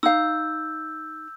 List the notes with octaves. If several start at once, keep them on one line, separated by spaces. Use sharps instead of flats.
D#4 F5 E6 G6